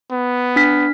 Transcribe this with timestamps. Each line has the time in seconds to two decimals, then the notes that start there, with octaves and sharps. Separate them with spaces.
0.11 B3
0.56 D4 F6 B6